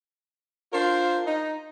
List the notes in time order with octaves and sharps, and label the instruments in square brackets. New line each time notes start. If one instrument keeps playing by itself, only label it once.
[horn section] D4 F4 A#4 C5
D#4